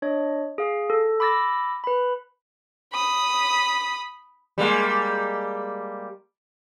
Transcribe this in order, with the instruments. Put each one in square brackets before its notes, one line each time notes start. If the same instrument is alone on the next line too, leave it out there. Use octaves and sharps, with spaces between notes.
[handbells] D4 C#5 D#5
G#4 F5
A4
B5 D6 E6 A6 A#6
B4 B5
[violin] B5 D#6
[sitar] G3 G#3 A#3